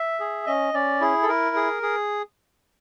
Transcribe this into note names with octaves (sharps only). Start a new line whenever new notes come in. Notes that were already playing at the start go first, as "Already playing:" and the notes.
Already playing: E5
G#4
C#4 D#5
C#4 D5
E4 G#4
A4
E4 A#4
G#4
G#4